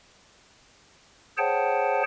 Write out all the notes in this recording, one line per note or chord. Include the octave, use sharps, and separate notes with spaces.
G#4 C5 C#5 F#5 G5 A5